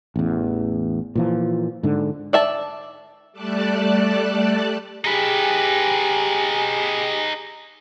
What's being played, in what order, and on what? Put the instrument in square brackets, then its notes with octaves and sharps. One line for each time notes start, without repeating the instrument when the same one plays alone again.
[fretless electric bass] A1 E2
A#2 E3 F3
G#2 D3
[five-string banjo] D5 E5 A5
[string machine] G3 A3 D5 A5 F#6
[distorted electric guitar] D#4 B4 [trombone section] G4 G#4